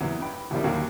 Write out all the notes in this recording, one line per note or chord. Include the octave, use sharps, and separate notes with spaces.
E2 C3 F#3
G2 G5 B5
G#1 E2 B2 D#3 F3 G3
D#2 D3 F#3 F#4 F5 G5